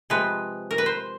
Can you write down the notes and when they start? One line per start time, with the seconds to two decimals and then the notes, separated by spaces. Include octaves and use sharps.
0.10 C3 F3 G#3 B4
0.71 A#4
0.78 B4
0.86 C5